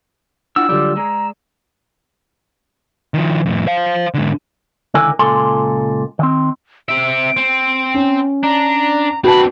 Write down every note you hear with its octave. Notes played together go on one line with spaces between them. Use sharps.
D4 E4 F4 F#5 E6
D3 F#3 G3 F4 G4 D5
G#3 G#4 D5 A#5
D#3 F3
F2 A2
C5 F5
G#2 D3
C#2 D3 D#3 E4 A#4 G#5
C#2 A#2 A4 G#5 C6
D#3 C4
C4 E5 D7
C4
C#4
D4 A#5
C4 D4 F#4 B4 A5 B5